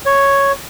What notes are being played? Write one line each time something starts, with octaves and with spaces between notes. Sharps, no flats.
C#5